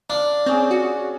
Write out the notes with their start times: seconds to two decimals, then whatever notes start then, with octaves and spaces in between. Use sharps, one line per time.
0.10 D4 F5
0.46 C4 C#4 G#4 C#5
0.71 F#4